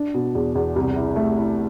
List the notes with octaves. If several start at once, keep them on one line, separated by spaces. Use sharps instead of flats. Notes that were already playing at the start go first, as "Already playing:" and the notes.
Already playing: D4
B2
E2
E2
C2
E4
A3
E4